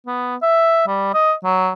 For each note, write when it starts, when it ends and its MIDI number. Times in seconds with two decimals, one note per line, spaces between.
0.07 0.36 59
0.42 0.86 76
0.87 1.12 55
1.14 1.34 75
1.44 1.71 54